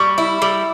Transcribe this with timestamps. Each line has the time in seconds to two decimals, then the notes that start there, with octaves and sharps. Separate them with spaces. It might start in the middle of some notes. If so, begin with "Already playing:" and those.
Already playing: G3 C#6
0.18 E4
0.42 G3